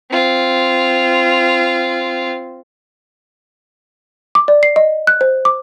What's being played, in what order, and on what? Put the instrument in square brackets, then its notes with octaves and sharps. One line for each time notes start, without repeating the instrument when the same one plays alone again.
[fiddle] C4 F4
[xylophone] D6
D5
C7
D#5
F#6
C5
D6